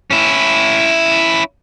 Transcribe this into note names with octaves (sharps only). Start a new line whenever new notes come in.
C#4 E4